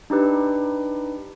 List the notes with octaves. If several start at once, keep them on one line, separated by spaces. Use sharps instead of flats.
D4 D#4 G4 B4